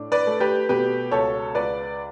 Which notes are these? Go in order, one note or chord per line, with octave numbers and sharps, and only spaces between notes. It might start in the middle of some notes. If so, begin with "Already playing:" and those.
Already playing: A2 D4
B4 D5
A3
G4 B4
B2 G4 B4
C#2 A4 C#5
C#2 B4 D5